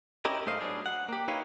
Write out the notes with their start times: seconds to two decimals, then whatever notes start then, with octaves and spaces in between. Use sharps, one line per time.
0.25 C#4 E4 G4 A#4 D#5
0.46 G#2 A3 C5 D#5 F5
0.61 F#3 B3 D4 G#4
0.86 F#5
1.09 A#3 G4
1.28 D#4 E4 G4 B4 C#5 F5